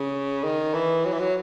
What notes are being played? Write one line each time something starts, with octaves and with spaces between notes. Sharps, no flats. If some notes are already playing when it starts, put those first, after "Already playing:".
Already playing: C#3
D#3
E3
F#3
E3
F#3